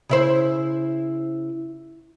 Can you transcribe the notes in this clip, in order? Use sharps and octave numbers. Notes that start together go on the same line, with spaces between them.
C#3 E4 C5